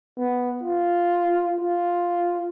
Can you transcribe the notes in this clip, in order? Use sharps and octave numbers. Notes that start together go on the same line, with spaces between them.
B3
F4
F4